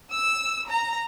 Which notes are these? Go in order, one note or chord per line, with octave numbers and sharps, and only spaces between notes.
E6
A#5